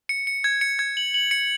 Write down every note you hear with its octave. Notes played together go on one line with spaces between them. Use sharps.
C#7
C#7
G#6
C#7
G#6
F#7
F#7
C#7